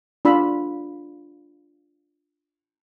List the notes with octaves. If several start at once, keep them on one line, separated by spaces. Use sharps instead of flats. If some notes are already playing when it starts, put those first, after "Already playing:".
D4 F4 B5 E6